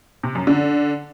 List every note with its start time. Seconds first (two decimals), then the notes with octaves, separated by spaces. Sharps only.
0.23 C3
0.35 F#2
0.47 D3